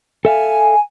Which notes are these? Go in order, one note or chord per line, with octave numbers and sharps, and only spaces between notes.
A4 E5 F5 G#5